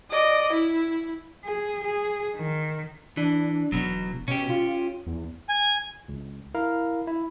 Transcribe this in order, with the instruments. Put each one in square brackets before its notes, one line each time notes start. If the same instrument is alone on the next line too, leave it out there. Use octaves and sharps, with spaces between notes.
[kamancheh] D5 D#5
E4
[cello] G#4
G#4
D#3
[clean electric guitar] E3 [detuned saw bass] D4
[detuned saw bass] E1 [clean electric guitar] B2 F#3
[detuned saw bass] B2 [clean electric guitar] C#4 G4
[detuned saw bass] F4
E2
[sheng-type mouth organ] G#5
[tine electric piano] C#2
E4 A#4 F5
E4